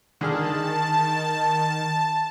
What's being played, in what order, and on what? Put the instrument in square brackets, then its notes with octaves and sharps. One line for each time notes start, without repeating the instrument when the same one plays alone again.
[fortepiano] D3 G#4 F6 [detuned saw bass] D#3 [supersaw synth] A5